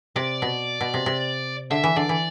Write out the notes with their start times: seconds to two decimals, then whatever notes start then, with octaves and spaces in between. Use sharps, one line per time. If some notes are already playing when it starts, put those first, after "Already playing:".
0.16 C3 D5
0.42 B2
0.81 B2
0.94 C3
1.06 C3
1.71 D3 E5
1.84 E3
1.96 D3 D5
2.09 E3